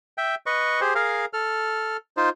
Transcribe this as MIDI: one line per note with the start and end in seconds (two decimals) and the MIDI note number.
0.18 0.35 76
0.18 0.35 79
0.46 0.80 71
0.46 0.80 75
0.46 0.80 85
0.81 0.94 67
0.81 0.94 68
0.81 0.94 72
0.95 1.25 68
0.95 1.25 70
0.95 1.25 77
1.33 1.97 69
1.33 1.97 89
2.17 2.29 63
2.17 2.29 65
2.17 2.29 72